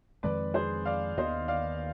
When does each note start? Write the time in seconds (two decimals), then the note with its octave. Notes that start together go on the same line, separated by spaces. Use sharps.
0.23 F2 D#3 G#3 C4 B4 D5
0.54 G#4 C5
0.85 D5 F5
1.17 D#2 D#3 B3 C5 D#5
1.48 D5 F5